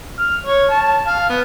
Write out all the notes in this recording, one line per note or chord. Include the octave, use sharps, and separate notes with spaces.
F6
C#5
A5
F5
B3